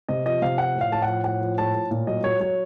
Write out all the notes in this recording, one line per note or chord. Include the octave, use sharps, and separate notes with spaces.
C3 D#5
F3 D#5
C3 F5
F3 F#5
A2
F5
A2 A5
F#5
F3
A2 F#5
F3
A2 A5
A2
A#2
F#3 D#5
F#3 C#5
F#3 C#5